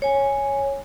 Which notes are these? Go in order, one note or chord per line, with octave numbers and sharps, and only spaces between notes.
C#5 G#5